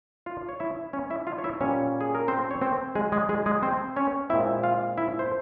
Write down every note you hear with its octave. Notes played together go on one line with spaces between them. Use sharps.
F4 F5
C#5
E4 E5
C#4 C#5
E4 E5
F4 F5
C#5
E4 E5
A#2 G3 A#3 C#4 C#5
G#4
A#4
C4 C5
C#5
C4 C5
G#3 G#4
G#3 G#4
G#3 G#4
G#3 G#4
C4 C5
C#4 C#5
A#2 G#3 C4 E4 E5
F4 F5
E4 E5
C5